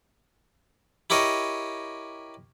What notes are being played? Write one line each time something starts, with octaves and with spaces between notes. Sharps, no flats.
E4 G4 A#4 C#5 D#5